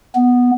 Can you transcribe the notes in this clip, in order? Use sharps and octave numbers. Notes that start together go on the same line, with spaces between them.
B3